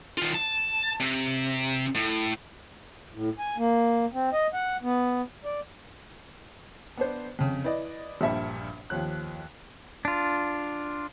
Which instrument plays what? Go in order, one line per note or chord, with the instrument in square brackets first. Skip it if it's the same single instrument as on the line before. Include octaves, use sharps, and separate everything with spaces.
[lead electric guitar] D#3 F4
A5
C3
A2
[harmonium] A2
G#5
A#3
C4
D#5
F#5
B3
D5
[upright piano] B3 D4 C5
F2 C#3
E4 B4 D5 D#5
A#1 G2 A#2 E5 B5
D#2 F3 C#5 F#6
[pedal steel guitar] D4 F4